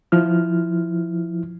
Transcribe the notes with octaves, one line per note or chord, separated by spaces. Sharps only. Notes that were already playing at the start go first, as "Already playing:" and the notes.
F3 E4 F6